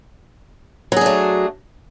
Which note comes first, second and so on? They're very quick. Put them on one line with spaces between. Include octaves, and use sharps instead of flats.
F#3 G#4 D4 A3